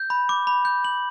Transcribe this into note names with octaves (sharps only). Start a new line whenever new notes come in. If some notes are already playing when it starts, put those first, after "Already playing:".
Already playing: G6
B5
D6
B5
G6
F#7